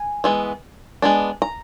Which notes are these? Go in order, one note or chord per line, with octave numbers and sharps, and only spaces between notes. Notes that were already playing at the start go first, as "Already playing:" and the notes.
Already playing: G#5
E3 G#3 B3
G#3 B3 D4
A#5